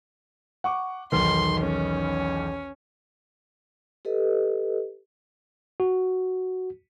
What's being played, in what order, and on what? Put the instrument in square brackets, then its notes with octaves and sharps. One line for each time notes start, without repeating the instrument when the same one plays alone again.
[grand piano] F#5 C#6 D6
[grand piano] B1 E2 D#3 [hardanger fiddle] C6
[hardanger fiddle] C#4
[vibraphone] G4 A4 B4 D#5
[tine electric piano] F#4